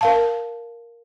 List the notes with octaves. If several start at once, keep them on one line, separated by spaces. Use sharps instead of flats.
A#4 F5 A5